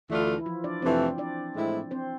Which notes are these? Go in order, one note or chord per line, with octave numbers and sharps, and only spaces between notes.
D2 D3 E3 A3 D4 E4 F4
E4
F3 F4
D4 D5
F2 C3 E3 A3 C4 C5
D4 D5
A2 G#3 C4 E4
C4 C5